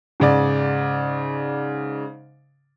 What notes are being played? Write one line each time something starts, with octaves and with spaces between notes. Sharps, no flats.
G#2 C#3 D5